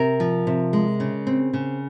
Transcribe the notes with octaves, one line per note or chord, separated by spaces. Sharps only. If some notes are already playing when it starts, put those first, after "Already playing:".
Already playing: C3 A#4
F3
C3
G#3
C#3
C4
C#3